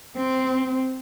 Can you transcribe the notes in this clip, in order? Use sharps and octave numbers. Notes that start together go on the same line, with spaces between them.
C4